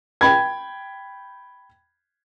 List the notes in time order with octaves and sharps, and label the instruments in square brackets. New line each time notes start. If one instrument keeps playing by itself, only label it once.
[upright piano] G5 B5 G#6